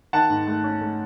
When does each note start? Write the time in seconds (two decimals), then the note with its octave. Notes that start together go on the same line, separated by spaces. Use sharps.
0.13 D#3 F#5 A5
0.30 G#2
0.47 A3
0.64 C#4
0.81 A3